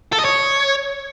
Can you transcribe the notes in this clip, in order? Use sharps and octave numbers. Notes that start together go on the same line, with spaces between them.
A4
D#5
C#5